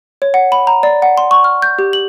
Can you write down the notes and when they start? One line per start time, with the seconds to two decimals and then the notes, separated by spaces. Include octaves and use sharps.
0.22 C#5
0.34 F#5
0.52 B5
0.67 A#5
0.83 D5
1.02 F#5
1.18 C6
1.31 C#6
1.44 F6
1.62 G6
1.79 G4
1.93 F#7